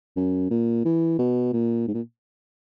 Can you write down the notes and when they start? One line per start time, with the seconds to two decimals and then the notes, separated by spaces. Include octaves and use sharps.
0.16 F#2
0.51 A#2
0.85 E3
1.19 B2
1.53 A#2
1.88 G#2
1.94 A#2